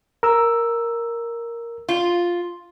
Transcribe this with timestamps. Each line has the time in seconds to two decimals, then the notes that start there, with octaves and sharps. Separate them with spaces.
0.23 A#4 E6
1.89 F4